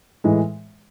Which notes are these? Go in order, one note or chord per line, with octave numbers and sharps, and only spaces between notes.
A2 E3 G#3